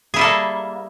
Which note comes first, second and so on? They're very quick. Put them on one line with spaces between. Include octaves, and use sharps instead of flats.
G#4 E4 G3 A4 A#3